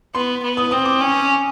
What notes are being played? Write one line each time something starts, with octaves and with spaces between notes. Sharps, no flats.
B3 C6
B3
D#6
C4 D#6
D6
C#4